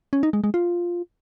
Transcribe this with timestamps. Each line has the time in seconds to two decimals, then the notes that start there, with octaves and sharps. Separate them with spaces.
0.13 C#4
0.23 D#4
0.33 G#3
0.44 G#3
0.54 F4